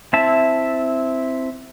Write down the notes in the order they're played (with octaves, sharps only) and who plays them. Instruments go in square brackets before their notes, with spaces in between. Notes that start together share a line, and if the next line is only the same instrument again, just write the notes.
[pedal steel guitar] C4 E4 E5 A5